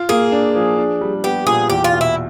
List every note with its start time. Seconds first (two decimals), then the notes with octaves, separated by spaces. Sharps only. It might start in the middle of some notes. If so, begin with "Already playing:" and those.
Already playing: F4
0.09 A#3 G#4
0.32 D4
0.55 F3
0.78 D4
1.01 G3
1.24 B3 G4
1.47 A#2 G#4
1.69 E2 G4
1.84 F4
1.93 B2
2.01 E4